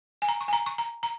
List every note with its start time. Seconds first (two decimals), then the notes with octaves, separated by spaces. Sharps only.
0.22 G#5
0.29 A#5
0.41 C#6
0.48 G#5
0.53 A#5
0.66 C#6
0.78 A#5
1.03 A#5